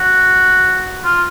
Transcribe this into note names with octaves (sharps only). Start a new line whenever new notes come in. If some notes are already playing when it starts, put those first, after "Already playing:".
Already playing: F#4
F4